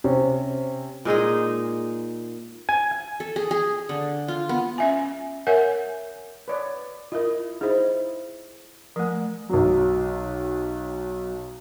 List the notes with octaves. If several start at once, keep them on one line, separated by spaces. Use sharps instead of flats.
C3 C4 C#4
A#2 G#3 D#4 G#4
G#5
A4
G#4
G#4
D3
F4
B3
C#4 E5 G#5
A#4 C#5 E5 F#5 G#5
B4 C#5 D5
E4 F4 A#4 D#5
D#4 E4 G#4 C5
F3 A3 A#4 G#5
B1 F#3